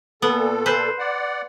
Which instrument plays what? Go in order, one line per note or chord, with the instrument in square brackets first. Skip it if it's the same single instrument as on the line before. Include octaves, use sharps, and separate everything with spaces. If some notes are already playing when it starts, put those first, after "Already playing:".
[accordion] A#2 A4 [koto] B3
[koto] B4 C5
[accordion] D5 F#5